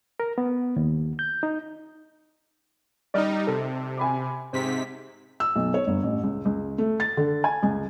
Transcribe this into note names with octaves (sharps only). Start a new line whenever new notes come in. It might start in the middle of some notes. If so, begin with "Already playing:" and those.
A#4
B3
D#2
G6
D#4
G3 D#4 D5 D#5 F6
C3 A4
G#5 B5 D6
G#2 C3 C4 B6
E6
B1
C#5
G1
A1
C#2
C#2
A3
A6
D3
G#5
C#2